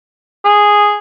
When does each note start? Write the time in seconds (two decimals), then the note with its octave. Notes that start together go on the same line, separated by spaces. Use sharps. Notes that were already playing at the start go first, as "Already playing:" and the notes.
0.45 G#4